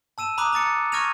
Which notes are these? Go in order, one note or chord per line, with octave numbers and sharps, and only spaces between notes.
A5 E6 D#7 E7
A#5 B5 D6 D#6 F#6
A#5 D6 A6 C#7
C#6 F6 G#6 A#6 D#7 F7